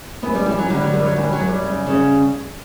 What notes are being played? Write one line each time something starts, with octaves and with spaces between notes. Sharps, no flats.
F#2 B3
G3
E3 G3
F#3
D3 G3
F#3
F#2 G3
F#3
F#2 G3
F#3
F#2
G3
C#3
C#3